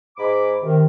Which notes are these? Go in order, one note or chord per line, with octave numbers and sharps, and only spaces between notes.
G#2 G#3 B5 D6
C3 D#3